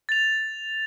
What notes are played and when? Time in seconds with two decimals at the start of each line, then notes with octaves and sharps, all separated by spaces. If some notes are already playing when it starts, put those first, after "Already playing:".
0.09 A6 F7